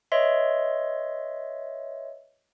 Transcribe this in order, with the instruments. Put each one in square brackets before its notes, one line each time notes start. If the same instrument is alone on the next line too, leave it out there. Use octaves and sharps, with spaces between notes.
[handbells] B4 C#5 D#5 E5 C6